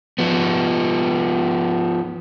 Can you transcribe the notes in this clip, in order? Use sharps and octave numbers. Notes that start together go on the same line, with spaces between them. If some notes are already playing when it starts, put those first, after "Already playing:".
F3 B3